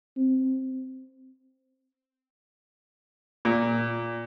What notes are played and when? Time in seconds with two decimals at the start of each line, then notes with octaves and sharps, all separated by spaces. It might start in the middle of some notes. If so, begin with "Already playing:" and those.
0.17 C4
3.45 A#2